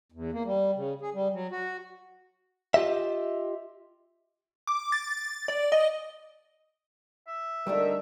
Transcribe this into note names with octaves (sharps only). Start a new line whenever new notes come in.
E2
A#3
G3
C#3
G#4
G3
F#3
F#4
F4 G4 D#5 E5
D6
A6
D5
D#5
E5
D3 G3 A3 D4 D#4 A#4